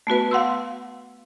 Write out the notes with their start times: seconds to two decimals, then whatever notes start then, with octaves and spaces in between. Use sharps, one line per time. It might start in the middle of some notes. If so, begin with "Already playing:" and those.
0.07 A3 B3 F#4 B4
0.31 F5 F#5 C6 E6